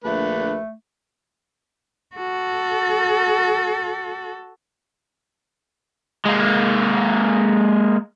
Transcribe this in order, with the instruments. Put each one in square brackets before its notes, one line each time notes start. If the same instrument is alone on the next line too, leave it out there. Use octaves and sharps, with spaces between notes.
[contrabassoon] A#1 [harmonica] D3 B4 [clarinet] A3
[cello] F#4 A4
[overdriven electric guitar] G#3 A#3